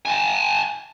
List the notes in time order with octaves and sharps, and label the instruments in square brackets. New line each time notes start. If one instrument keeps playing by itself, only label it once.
[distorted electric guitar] G#5 A5